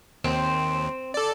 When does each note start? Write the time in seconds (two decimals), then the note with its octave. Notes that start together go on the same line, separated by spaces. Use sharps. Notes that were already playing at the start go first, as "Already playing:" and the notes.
0.24 D#2 C4
1.14 A4 D5